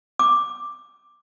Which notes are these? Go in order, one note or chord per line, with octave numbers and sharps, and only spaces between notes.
D6